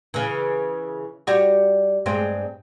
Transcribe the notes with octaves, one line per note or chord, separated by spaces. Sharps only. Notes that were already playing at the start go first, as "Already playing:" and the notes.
C#3 E3
G3 F#4
G2 G#3 C4